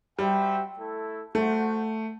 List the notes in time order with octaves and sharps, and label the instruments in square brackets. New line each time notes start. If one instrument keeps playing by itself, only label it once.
[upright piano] G3 [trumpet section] F#4 C5 E5 G5
[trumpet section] A3 E4 A4
[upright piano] A3 [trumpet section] F#4 C5 F#5